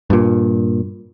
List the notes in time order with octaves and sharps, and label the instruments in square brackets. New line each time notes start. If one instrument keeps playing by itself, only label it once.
[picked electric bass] G2 A#2